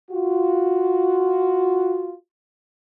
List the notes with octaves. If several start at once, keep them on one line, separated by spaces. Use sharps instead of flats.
F4 F#4